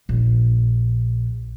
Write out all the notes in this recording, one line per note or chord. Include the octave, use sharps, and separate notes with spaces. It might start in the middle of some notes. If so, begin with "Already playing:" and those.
A#1